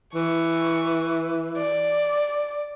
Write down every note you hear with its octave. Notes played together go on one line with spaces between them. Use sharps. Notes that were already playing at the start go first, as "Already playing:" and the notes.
E3 C#6
D5